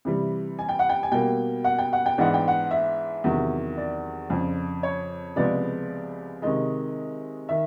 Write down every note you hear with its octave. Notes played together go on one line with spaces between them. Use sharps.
C3 E3 G3
G#5
G5
F#5
G5
G#5
B2 G3 A#3 G5
F#5
G5
F#5
G5
G#2 E3 G#3 B3 D4 F#5
G5
F#5
E5
E2 C3 D#3 F#3
D5
F2 C#3 F3
C#5
C#2 C3 F3 G#3 B3 D5
C3 D#3 G#3 D#5
D#3 E5